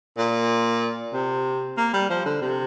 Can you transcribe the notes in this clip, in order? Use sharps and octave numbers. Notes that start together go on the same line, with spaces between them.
A#2
C3
A#3
G3
F3
D3
C3